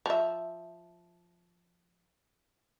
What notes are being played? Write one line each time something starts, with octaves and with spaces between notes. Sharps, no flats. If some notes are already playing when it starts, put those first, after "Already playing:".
F3 E5